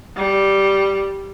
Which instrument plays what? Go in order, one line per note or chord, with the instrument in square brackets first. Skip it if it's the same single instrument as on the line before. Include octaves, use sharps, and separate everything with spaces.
[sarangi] G3